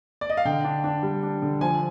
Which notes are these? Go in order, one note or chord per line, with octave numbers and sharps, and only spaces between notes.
D5
D#5
F5
D3 G5
D4
D4
G3
D4
D3
F3 G#5